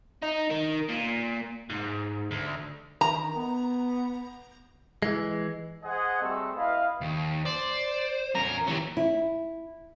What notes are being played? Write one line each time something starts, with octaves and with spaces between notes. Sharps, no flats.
D#4
D#3
A#2
G#2
D2
D#3 A#5
B3
E3 G#3
G#4 C5 D#5 F#5
G3 A3 C4 F#4 G#4 A4
E4 B4 D#5 F5
D#2
C5 D5
E2 C#4 A#4
D#2 E3 G4 C#5
E4